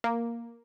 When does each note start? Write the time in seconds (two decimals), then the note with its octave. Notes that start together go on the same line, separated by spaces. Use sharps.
0.04 A#3